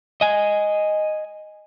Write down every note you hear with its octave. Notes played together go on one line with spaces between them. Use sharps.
D#5 G#5